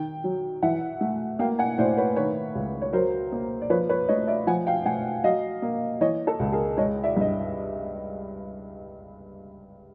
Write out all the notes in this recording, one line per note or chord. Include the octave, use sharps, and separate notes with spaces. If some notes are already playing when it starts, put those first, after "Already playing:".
Already playing: D#3 G5
F#3
E3 E5 F#5
A3
A#3 F5 G5
F#5 G#5
A2 C5 D5
B4 C#5
D#3 B4 C#5
C#2
C#5
F#3 A#4 C5
A#3
D5
F3 B4 C#5
B4 C#5
A3 C#5 D#5
D5 E5
F3 F#5 G#5
F5 G5
A3 F#5 G#5
F#3 D#5 F5
A#3
E3 C#5 D#5
A4
C#2
G#4 A#4
G#3 C#5 D#5
D5 E5
G2 D#5